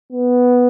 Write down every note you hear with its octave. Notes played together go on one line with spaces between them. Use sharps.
B3